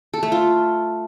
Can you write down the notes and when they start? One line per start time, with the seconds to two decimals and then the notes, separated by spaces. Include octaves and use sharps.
0.14 A4
0.23 A3
0.32 F4